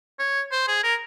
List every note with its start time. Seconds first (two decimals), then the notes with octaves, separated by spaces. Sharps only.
0.19 C#5
0.52 C5
0.68 G#4
0.83 A#4